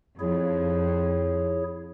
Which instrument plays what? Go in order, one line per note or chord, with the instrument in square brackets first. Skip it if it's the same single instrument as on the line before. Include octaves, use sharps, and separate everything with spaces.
[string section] F2 [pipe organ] E4 G#4 C#5